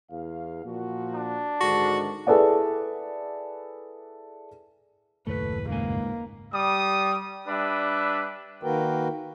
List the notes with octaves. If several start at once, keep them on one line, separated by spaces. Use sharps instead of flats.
E2 F5
A#2 F3 F#4
D4
G#2 D3 D#3 F#4
E4 G#4 A4 B4 D5 F#5
F#1 D#2 A2 A3 B4
C#2 G#2 A#3 G#5
G3 D#6
G3 D4 B4 E5
D#3 A#3 F#4 A#4 B4 G5